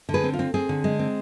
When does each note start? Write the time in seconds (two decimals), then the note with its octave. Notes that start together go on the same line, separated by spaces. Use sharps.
0.09 D3
0.14 G#4 B4
0.24 C4
0.33 F4
0.39 C4
0.54 C4 G#4
0.69 D3
0.84 G#3
0.99 C4